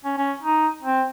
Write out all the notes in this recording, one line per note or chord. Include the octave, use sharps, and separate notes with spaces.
C#4
C#4
D#4
C4